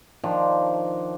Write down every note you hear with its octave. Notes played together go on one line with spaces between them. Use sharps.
D#3 F3 D4